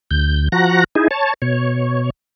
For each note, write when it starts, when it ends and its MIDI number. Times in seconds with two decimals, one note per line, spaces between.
0.11 0.48 38
0.11 0.48 91
0.52 0.84 53
0.52 0.84 66
0.52 0.84 78
0.52 0.84 82
0.52 0.84 90
0.52 0.84 94
0.95 1.08 63
0.95 1.08 64
0.95 1.08 68
1.11 1.34 73
1.11 1.34 81
1.42 2.10 47
1.42 2.10 73